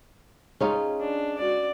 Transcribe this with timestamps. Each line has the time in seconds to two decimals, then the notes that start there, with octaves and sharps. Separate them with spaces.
0.60 G#3 C#4 D#4 F4
1.00 D4
1.38 F#4 D5